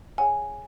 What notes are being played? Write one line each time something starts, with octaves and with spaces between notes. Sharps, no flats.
G#4 C#5 F#5 G#5